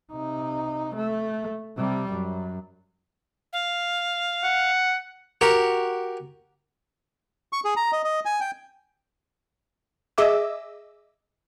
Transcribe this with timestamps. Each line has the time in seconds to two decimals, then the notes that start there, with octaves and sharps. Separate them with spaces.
0.11 C3 D#4
0.96 A3
1.77 C3 G3
2.12 F#2
3.53 F5
4.43 F#5
5.41 F#4 G4 A#4
7.53 C#6
7.65 G#4
7.76 A#5
7.92 D#5
8.04 D#5
8.25 G#5
8.40 G5
10.18 G#4 D#5 E5 D6 E6